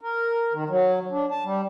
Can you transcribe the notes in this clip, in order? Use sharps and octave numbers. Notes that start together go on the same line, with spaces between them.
A#4
D#3
F#3
D4
A5
G3